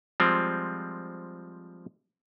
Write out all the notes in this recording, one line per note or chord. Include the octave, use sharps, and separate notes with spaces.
F3 G3 G#3 C4